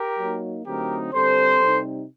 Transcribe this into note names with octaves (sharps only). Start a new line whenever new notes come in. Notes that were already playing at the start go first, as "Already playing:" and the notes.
Already playing: G4 A#4
F#3 A#3 D#4
D3 F#3 A3 C4 D#4 G4 A#4
D3 G3 C4 A4 C5
C3 G3 C4 D#4